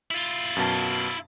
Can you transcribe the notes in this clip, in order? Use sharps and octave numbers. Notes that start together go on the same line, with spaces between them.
E4 F4
F#2 B2 A5